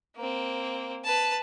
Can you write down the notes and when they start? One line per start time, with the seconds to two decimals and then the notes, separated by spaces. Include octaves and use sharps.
0.16 A#3 C4
1.04 B4 A5